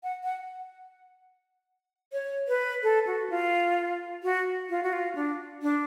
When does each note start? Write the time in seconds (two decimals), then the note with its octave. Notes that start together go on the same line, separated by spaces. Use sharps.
0.03 F#5
0.23 F#5
2.13 C#5
2.48 B4
2.83 A4
3.07 F#4
3.30 F4
4.23 F#4
4.70 F4
4.83 F#4
4.93 F4
5.15 D4
5.62 D4